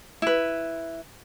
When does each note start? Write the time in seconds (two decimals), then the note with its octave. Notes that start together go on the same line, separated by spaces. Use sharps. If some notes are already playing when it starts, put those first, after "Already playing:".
0.22 E4 B4